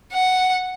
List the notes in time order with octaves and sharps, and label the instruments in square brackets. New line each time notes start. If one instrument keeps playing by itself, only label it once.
[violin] F#5